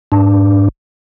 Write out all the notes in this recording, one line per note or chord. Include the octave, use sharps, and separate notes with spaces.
G#2 D4